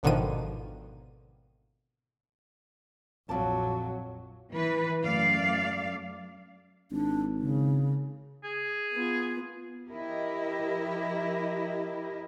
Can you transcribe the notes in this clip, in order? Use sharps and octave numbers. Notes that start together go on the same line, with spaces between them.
G#1 B2 D3 D#3 F3 D#7
A#1 F2 F#3 D5 A5
E3 B4
F#2 A3 D5 F5
G#1 D4
C#3
G#4
B3 F4
F3 E4 G4 A#4 D#5